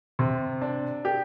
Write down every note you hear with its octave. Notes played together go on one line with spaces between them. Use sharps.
C3
D4
G4